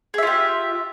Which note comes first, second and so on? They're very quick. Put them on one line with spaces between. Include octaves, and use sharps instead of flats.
G#4 E5 F4 G4